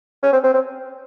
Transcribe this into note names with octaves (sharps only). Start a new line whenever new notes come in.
C#4
C4
C4
C4